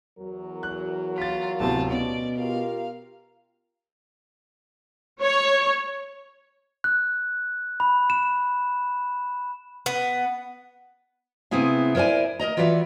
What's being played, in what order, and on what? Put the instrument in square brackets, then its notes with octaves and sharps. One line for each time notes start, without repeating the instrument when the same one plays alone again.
[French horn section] E2 F#3 A#4
[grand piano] F#6
[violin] F4 [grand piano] A6 B6
[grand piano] D1 C3 B3 [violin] F4 A5
[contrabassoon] B2 [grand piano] C#4 [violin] D5
[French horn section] F4 G4 A#4 [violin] F5
[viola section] C#5
[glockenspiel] F#6
B5
E7
[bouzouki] B3
[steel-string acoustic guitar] C3 B3 C4 E4 G#4 F5
E4 A#4 C5 D5 G#5
A#4 C5 D#5 A#5
E3 F4 F#4 B4 D5 E5